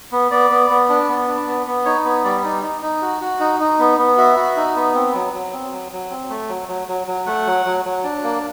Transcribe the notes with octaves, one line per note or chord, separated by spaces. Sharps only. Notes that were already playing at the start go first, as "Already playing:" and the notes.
B3
B3 D5
B3
B3
D4
B3
D4
B3
B3
D#4 C#5
B3
G3 D5
D#4
D#4
D#4
F#4
F#4
D#4
D#4
B3
B3
F#4 E5
F#4
D#4
B3
C4
F#3
F#3
C4
F#3
F#3
C4
A3
F#3
F#3
F#3
F#3
A3 F#5
F#3
F#3
F#3
D4
A#3